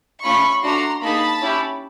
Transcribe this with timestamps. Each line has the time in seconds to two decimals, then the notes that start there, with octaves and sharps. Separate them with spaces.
0.24 A3 C#4 F4 B5 C#6
0.63 A3 D4 F#4 A#5 C6
1.02 A#3 D#4 G#4 A5 B5
1.41 C#4 E4 G4